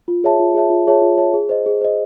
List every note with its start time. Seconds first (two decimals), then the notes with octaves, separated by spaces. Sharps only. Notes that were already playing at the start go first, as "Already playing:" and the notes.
0.08 F4
0.24 G#4 C#5 E5 A5
0.40 F4
0.55 G#4 C#5 E5 A5
0.70 F4
0.87 G#4 C#5 E5 A5
1.02 F4
1.18 G#4 C#5 E5 A5
1.34 G#4
1.49 C5 D#5
1.66 G#4
1.81 C5 D#5